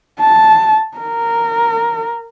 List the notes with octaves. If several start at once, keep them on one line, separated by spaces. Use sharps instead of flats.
A5
A#4